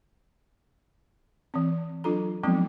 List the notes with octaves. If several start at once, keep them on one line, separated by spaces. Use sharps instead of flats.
E3 C4
F#3 D4 F4 A4 A#5
F3 F#3 G#3 B3 C4 D#4